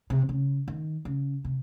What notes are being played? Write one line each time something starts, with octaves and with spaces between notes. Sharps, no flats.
C3
C#3
D#3
C#3
C3